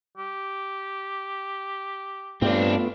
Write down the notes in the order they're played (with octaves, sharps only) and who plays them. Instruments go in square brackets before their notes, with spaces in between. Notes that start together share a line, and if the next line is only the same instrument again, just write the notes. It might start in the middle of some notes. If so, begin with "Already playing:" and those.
[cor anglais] G4
[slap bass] G2 [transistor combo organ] A3 B3 F4 [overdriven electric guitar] C4 D4